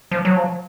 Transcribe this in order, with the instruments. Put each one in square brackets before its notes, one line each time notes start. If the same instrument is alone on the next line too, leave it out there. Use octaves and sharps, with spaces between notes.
[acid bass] F3
F#3
F3